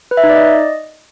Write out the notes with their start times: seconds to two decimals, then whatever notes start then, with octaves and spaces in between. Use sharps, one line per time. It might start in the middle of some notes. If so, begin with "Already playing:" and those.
0.11 B4
0.17 E5
0.23 D#4
0.30 D5
0.36 D#5